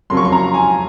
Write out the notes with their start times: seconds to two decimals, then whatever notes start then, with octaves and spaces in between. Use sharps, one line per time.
0.10 F2 C#3 F#3 A#3 C6
0.17 C#6
0.25 C6
0.32 A#5
0.54 G#5